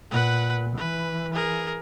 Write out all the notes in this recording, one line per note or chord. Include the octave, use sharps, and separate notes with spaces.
A#2 B4 F#5
E3 B4
G#4 A#4